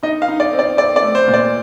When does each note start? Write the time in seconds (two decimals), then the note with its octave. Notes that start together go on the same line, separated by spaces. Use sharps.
0.03 D#4 D#5
0.22 F5
0.28 D#4
0.40 D5
0.53 C4
0.59 D5
0.77 C4 D5
0.96 D5
1.03 A3
1.15 C5
1.28 A#2
1.34 D5